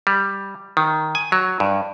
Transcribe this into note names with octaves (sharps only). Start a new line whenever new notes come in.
G3
D#3
G#5
F#3
G2